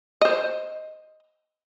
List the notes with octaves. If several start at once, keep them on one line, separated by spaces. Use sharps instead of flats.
C5 D#5